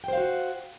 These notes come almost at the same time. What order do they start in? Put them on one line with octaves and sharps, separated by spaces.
G5 C5 F5 F#4